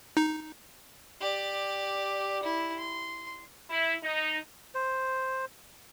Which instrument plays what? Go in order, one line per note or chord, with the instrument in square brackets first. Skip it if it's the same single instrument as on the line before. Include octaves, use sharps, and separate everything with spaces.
[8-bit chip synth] D#4
[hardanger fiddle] G4 D5
E4
C6
[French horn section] E4
D#4
[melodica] C5